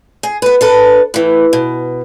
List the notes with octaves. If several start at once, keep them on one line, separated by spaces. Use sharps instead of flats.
G#4
B3 B4
D4 A4 B4
A2 E3
B2